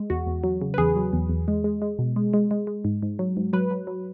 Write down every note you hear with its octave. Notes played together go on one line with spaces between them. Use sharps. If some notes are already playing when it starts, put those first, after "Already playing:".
Already playing: G#3
E2 F#4
E2
F#3
C#3
B4
E2 G#4
F#3
E2
E2
G#3
G#3
G#3
B2
G#3
G#3
G#3
G#3
G#2
G#2
F#3
G#2
F#3 B4
F#3
F#3